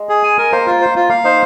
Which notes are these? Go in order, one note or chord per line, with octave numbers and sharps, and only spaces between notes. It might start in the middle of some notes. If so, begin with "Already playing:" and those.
Already playing: G#3
G#4
G#5
A#4
A#3 C5
F4
C5
F4
A#3 F5
D#4 C5